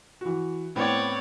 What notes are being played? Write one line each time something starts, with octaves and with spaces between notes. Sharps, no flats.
E3 F#4
A2 B3 C4 C#5 D5